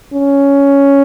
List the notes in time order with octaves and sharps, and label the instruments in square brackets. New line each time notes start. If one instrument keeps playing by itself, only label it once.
[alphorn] C#4